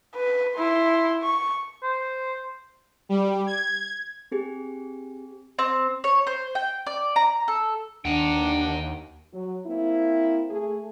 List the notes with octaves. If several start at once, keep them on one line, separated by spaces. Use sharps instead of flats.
B4
E4 C6
C#6
C5
G3
G#6
C4 G4 G#4
C4
C#5
C5
G5
D5
A#5
A4
D#2 D4 F#5 G5 A#5
F#3
A#3 C4 E4
A3 G#4